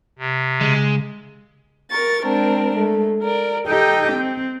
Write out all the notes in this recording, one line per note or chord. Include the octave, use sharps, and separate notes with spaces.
C3
C#3 G#3
A#4 C#6 A6
G#3 C4 D4 A#4
G#3 A3
A#4 D5
D#4 G4 A4 D#5 G5
C4